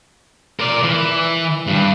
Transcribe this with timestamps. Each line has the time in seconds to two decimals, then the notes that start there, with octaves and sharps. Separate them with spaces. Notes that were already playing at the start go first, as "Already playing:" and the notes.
0.60 A#4 D5
0.83 E3
1.67 G2